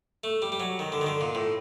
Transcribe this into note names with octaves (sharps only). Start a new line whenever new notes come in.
A3
G3
G3
F#3
D#3
D3
D#3
D3
A#2
A2